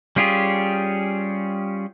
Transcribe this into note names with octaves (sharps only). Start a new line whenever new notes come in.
G3 C#4 F4 G4 G#4